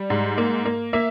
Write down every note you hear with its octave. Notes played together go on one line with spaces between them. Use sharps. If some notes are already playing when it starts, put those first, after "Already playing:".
Already playing: G3
G#2
A#3
A#3
A#3 E5